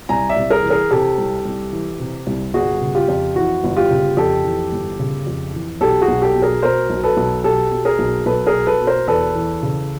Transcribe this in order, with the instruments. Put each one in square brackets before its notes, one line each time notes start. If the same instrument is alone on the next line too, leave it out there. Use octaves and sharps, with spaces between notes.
[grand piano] C2 G#5 A#5
D5 E5
C2
G#4 A#4
E3
G#4 A#4
C3 G4 A4
C2
C2
E3
C3
C2
G1 F#4 G#4
C#3
F4 G4
F2
E3 E4 F#4
G1
F4 G4
C#3
F2 G4 A4
E3
G1
C#3
F2
E3
B1 G4 A4
F#4 G#4
B1
G4 A4
B2
G#4 A#4
B2 A#4 C5
B1
A4 B4
B1
B2 G4 A4
B2
G#4 A#4
B1
B1 A4 B4
G#4 A#4
B2
A4 B4
B2
A#4 C5
E2 A4 B4
E3
C#3